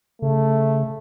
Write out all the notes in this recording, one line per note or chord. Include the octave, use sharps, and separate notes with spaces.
C#3 A3